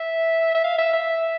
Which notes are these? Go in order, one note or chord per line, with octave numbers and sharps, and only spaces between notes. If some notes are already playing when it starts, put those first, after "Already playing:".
Already playing: E5
E5
F5
E5
E5